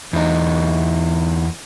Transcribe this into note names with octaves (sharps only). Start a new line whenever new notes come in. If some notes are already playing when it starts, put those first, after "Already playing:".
E2 D#4